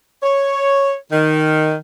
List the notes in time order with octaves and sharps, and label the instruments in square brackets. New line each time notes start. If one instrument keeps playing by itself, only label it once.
[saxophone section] C#5
D#3